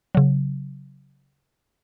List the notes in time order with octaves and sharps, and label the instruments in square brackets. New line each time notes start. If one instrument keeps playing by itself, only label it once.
[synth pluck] C#3 F#3